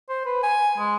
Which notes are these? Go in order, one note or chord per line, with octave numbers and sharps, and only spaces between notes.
C5
B4
G#5
G#3